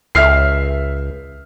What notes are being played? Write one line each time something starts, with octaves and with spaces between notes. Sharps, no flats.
C#2 E5 F6 C7